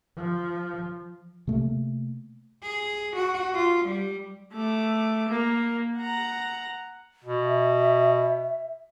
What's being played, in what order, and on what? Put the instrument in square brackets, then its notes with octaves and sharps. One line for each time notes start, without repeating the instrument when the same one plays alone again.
[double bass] F3
[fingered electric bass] C3 A3 A#3
[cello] G#4
F#4
F4
G3
[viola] A3 D6
A#3
F#5 A#5
[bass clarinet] B2
[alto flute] E5